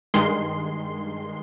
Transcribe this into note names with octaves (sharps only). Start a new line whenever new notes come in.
G2 D#3 G#3 C6